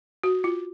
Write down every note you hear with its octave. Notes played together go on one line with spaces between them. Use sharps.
F#4
F4